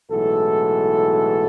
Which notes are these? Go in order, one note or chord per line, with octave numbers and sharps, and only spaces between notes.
B1 A2 E3 G#3 F#4 A4